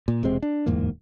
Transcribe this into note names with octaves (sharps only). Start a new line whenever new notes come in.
A#2
E1 C3 G#3 C4
D4
D1 E2 G#2 A#3